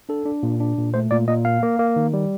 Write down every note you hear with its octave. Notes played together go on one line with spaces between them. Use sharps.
D4 A4
D4
A#2
D4
A#2
A3 C5
A#2 D5
A#2 D#5
A#3 F5
A#3
A#3
D#3
G3